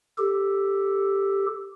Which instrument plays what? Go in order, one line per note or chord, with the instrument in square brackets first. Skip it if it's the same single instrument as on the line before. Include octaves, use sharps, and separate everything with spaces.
[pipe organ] G4 A4